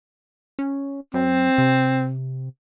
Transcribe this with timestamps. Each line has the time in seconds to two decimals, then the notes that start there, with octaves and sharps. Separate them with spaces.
0.59 C#4
1.14 F#2 C4
1.58 C3